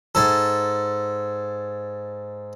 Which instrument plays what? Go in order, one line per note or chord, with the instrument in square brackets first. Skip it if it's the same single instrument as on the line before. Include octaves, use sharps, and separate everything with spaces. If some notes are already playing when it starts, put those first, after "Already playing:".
[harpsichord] G#2 A4